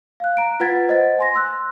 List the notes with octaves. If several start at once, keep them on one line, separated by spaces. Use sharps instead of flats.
F5 F#6
A#5 D7
F4 B4 F#5 G#6 A6 B6
C5 D#5 F#5 A6
G#5 C6 A#6
C6 E6 F#6